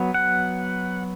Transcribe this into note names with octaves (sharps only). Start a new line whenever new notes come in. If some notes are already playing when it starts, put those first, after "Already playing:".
Already playing: F#3 B3
F#5